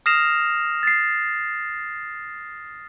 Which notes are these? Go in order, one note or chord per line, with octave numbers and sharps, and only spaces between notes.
D#6 F6 A#6 C7 E7 F7
A6 C7